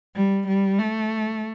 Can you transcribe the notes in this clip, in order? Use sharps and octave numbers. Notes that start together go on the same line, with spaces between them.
G3
G3
A3